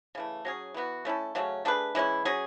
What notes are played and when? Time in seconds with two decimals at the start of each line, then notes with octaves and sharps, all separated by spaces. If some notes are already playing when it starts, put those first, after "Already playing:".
0.15 C#3 E3 A3
0.45 F#3 C#4 G#4
0.74 E3 B3 F#4
1.05 A3 C#4 E4 A4
1.35 C#3 F#3 A3 C#4
1.65 A3 D4 G#4 B4
1.95 E3 G#3 C#4 E4
2.25 F#3 C#4 G#4